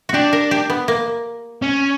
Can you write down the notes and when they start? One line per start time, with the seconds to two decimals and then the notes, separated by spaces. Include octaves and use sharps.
0.09 D4 F#4 G4
0.33 A#4
0.51 G4
0.70 B3
0.88 A#3
1.62 C#4